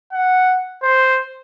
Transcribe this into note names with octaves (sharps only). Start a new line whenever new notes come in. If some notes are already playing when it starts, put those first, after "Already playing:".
F#5
C5